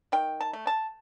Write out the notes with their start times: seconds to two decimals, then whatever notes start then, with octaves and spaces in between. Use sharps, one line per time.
0.12 D#3 G5
0.41 A5
0.53 A3
0.67 A5